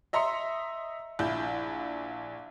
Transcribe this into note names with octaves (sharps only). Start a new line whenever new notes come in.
D#5 E5 A#5 C6 C#7
A#1 E4 G6